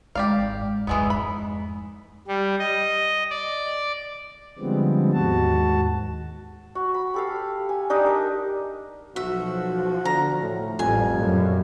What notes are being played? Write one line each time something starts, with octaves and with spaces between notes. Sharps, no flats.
G#1 G#2 G4 D5 F5
F2 G#2 E3 G#3 B3
B5
G3
D#5
D5
D3 F3 G3 G#3 B3 C4
D#2 G#2 F#4 A5
F#4
B5
G4 A4 F5
G#5
D4 D#4 G4 D#5
A#4
B1 F3 F#4 E5
D3 A#5
A2
A1 F2 G3 G#5
F#2 A#2